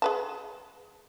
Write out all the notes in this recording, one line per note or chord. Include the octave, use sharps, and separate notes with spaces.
G#4 B4 A5